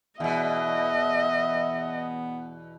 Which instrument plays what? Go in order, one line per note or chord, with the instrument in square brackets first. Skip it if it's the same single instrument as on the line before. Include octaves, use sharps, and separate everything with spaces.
[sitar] E2 B2 [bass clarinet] B3 [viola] D#5 [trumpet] E5